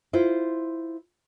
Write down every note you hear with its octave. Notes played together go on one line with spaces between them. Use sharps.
E4 F4 C5